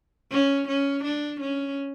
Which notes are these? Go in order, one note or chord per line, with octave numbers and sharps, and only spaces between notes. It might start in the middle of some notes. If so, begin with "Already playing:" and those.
C#4
C#4
D4
C#4